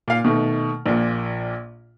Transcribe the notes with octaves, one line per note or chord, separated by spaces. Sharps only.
A#2 F5
B2 D#3 A3
A#1 A#2